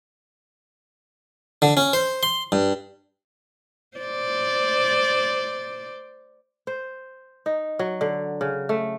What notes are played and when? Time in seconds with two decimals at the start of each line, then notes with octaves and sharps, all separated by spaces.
1.62 D3
1.77 C#4
1.93 C5
2.23 C6
2.52 G2
3.97 C5 D5
6.67 C5
7.46 D#4
7.79 F#3
8.01 D3
8.41 C#3
8.69 A3